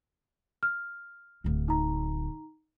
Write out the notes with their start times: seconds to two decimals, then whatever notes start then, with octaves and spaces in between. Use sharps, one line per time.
0.63 F6
1.44 D1 D2
1.68 D#4 A#5